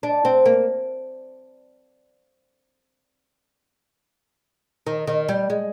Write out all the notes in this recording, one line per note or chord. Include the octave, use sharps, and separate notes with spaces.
D4
C4
A#3
D#3
D#3
G3
G#3